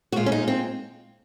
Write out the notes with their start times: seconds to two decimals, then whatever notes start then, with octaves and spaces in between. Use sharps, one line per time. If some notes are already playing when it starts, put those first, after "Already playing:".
0.12 F#4
0.16 A#2 G#3 F4
0.26 C#4
0.32 D#4
0.48 C4